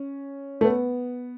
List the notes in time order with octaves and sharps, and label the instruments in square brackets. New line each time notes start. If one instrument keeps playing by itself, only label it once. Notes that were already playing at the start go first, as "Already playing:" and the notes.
Already playing: [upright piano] C#4
A3
B3